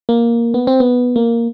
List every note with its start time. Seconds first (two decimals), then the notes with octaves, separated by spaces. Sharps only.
0.09 A#3
0.54 B3
0.67 C4
0.80 B3
1.16 A#3